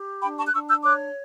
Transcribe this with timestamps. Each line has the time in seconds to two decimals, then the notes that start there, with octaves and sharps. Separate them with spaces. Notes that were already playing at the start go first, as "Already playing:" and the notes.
Already playing: G4
0.22 D4 G5 B5
0.37 A5 C#6
0.46 F#6
0.52 D4 C#6 E6
0.68 E6 G6
0.83 C#5 D6 F#6